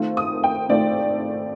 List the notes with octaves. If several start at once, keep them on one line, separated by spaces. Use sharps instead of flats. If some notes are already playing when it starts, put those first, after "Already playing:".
Already playing: D#3 A3 C4 F4
D#6
G5
D#3 A3 C4 F4 D5